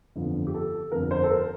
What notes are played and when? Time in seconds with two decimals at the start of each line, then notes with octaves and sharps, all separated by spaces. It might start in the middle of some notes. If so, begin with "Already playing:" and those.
0.16 G1 F2 D3 F3
0.47 G4
0.54 A4
0.92 G1 F2 D3 F3 A#4
1.11 C5
1.24 A4
1.30 A#4